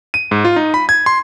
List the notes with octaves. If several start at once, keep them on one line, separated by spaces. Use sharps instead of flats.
D#7
G#2
F4
D#4
B5
G#6
C6